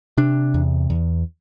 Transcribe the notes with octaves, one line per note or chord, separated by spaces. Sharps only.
C3 D4
E2
E2